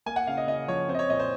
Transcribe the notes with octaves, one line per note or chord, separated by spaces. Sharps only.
A#3 G#5
F#5
C#3 F5
D#5
C#3 D#5
F3 C#5
C4 C5
D#5
C#5
A#2 D#5
C5